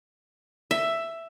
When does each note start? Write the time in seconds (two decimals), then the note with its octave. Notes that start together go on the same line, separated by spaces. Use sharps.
0.71 E5